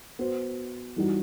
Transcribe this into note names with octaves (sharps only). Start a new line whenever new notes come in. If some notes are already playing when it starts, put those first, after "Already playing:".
B3 F#4 C5
E3 G3 D#4 F#4